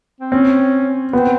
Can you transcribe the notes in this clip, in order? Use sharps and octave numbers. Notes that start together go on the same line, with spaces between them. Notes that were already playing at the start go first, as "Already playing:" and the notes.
C4
C4 C#4
B3 C4